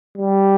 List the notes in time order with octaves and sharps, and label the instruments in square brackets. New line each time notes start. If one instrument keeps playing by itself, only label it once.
[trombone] G3